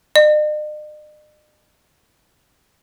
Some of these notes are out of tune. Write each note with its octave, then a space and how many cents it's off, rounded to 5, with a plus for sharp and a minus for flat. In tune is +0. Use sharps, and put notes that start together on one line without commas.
D#5 -45